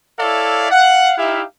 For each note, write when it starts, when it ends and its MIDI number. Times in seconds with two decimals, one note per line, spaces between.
0.19 0.68 64
0.19 0.68 69
0.19 0.68 73
0.19 0.68 74
0.19 0.68 76
0.19 0.68 77
0.71 1.13 77
0.71 1.13 78
1.18 1.43 63
1.18 1.43 64
1.18 1.43 67
1.18 1.43 76
1.18 1.43 77